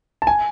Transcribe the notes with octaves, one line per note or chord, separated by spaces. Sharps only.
A5
G#5